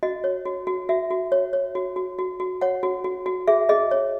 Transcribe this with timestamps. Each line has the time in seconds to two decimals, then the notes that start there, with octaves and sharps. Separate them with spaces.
0.03 F#4 D#5
0.24 C#5
0.45 F#4
0.67 F#4
0.89 F#4 E5
1.10 F#4
1.32 C#5
1.53 C#5
1.75 F#4
1.96 F#4
2.19 F#4
2.40 F#4
2.61 C#5 F#5
2.83 F#4
3.04 F#4
3.26 F#4
3.48 G#4 E5
3.69 G#4 D#5
3.91 C#5